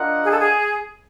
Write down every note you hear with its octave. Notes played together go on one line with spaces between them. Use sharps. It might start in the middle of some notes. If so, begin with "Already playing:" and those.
Already playing: D4 F4 A#4 D#5 F#5
G#4
A4
G#4